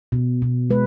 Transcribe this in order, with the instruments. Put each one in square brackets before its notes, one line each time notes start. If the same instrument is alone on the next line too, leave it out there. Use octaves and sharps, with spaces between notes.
[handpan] B2
B2
G#3 B4